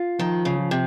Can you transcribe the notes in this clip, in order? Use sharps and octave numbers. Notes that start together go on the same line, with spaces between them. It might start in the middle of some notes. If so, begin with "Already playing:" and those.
Already playing: F4
D#3 F3
C#3
F3
C3